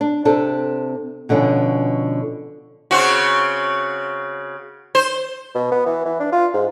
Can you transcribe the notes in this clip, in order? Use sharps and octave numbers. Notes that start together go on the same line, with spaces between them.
D4
C3 C4 D4 A4
B2 D3 F3 C#4
C#3 C4 F#4
C5
B2
B3
E3
E3
D4
F4
G#2